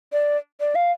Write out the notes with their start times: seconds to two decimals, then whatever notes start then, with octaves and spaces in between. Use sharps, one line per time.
0.13 D5
0.60 D5
0.75 F5